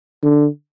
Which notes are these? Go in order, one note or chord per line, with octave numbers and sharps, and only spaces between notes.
D3